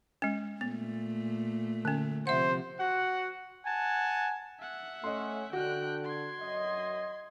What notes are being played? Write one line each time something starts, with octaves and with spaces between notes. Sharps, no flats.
G#3 C#4
A#2 A3 B3
D3 C#4
C3 F3 C5 E5 F#5
F#4 F#5
F#5 G#5 A5
E5 F#5
A3 C#4 D#5 C6
D3 F#4 G5 F#6
C6 G#6
F#2 D#5